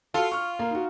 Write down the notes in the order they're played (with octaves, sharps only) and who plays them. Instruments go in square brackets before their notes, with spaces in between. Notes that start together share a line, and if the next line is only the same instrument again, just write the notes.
[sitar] F4 [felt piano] F#4 A4
[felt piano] C#6 F6
A#3
D#4 F#4